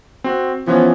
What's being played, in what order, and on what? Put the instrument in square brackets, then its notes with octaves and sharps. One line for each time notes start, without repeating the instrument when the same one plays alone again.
[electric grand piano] C4 F#4
[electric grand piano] E3 B3 C#4 [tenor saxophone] F3